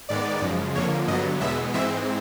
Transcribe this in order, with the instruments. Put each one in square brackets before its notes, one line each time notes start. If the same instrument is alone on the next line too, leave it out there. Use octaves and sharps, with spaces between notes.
[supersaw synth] G#2 D#3 G#3 B3 D5
F#2 C#3 F3 G#3
F2 D3 F3 A#3 C#5
G2 D3 F#3 B3 D#5
E2 B2 G#3 B3 E5
G#2 E3 G#3 C4 E5